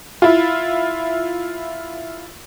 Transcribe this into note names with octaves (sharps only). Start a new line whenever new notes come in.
E4 F4